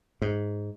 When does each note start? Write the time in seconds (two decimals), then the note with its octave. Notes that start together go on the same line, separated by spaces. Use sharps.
0.22 G#2